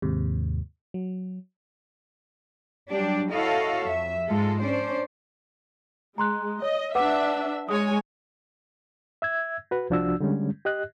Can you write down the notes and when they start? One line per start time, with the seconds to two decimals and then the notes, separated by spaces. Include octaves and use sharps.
0.02 D#2 G#2 C3
0.94 F#3
2.88 F#3 G3 D4 G4 D5
3.30 E4 F#4 A4 C#5 D#5 F5
3.85 F2 E5
4.28 G#2 G#3 F4 A4
4.60 C#4 D4 C5 D5
6.18 G#3 A#5 C6 F#6
6.62 C#5 D#5
6.95 D4 B4 E5 F#5 D6
7.69 G#3 C#5 G#5 D#6
9.22 E5 E6 G#6
9.71 F#4 B4
9.90 C2 F3 D4 F#4 E6
10.20 D3 G3 G#3 C#4
10.65 G4 D#5 F#6